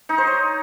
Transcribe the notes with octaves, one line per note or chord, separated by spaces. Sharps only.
D#4
C5
C#5